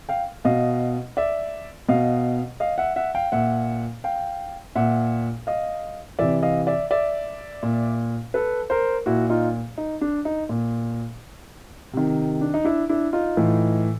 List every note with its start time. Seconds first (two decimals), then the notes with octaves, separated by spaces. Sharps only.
0.09 F5 G5
0.45 B2 D#5 F5
1.17 D5 E5
1.89 B2 D#5 F5
2.60 D#5 F5
2.78 E5 F#5
2.96 E5 F#5
3.15 F5 G5
3.32 A#2 E5 F#5
4.04 F5 G5
4.75 A#2 E5 F#5
5.47 D#5 F5
6.19 C3 E3 D5 E5
6.43 D#5 F5
6.67 D5 E5
6.91 D5 E5
7.63 A#2
8.34 A4 B4
8.70 A#4 C5
9.06 A#2 E4 F#4
9.30 D#4 F4
9.78 D#4
10.01 D4
10.25 D#4
10.49 A#2
11.93 C3 D#3
12.41 D4
12.54 D#4
12.64 D4 E4
12.89 D4 E4
13.13 D#4 F4
13.37 A2 E3